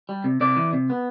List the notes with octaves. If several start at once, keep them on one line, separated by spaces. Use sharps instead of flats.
G3
C3
C3 D5
E3
C3
B3